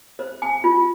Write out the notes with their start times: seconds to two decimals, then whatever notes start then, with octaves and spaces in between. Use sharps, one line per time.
0.19 C5
0.42 G#5
0.64 F4